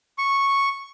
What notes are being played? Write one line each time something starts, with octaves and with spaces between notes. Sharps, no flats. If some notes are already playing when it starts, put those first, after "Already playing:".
C#6